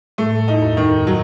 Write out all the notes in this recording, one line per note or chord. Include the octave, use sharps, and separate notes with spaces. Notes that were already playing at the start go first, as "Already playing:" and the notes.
A2 A3
D#4
E2
F#2
D#3
F#3